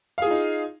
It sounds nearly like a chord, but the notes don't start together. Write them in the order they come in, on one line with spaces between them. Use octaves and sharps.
F5 G#4 F4 D#4